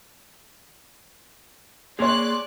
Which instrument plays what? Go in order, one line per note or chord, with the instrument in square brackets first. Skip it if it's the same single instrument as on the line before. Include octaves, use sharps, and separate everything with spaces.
[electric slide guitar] A#3 G#4 [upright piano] C#5 F7 [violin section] D5 F#6 [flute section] C6